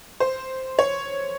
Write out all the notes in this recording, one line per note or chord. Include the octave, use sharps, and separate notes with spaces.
C5
C#5